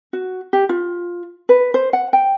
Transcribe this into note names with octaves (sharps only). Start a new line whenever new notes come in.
F#4
G4
F4
B4
C5
F#5
G5